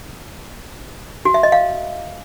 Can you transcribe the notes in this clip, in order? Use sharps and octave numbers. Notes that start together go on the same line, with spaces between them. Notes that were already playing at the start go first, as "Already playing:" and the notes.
F#4
E5
D#5
F5